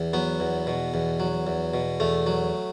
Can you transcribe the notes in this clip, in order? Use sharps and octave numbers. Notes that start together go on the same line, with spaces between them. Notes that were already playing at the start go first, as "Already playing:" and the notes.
Already playing: E2
F#3 B3
E2
B2
E2
F#3
E2
B2
E2 A3
F#3